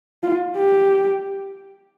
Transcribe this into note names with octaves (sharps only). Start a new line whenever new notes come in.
F4
G4